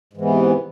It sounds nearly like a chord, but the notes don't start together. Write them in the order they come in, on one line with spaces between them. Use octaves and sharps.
G#2 E3 B3 C3